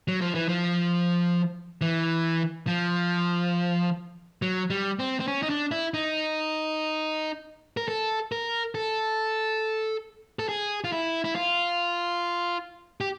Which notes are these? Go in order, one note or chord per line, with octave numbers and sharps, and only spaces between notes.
F#3
F3
E3
F3
E3
F3
F#3
G3
C4
C4
C#4
D#4
D4
E4
D#4
A#4
A4
A#4
A4
A4
G#4
F4
E4
E4
F4
G4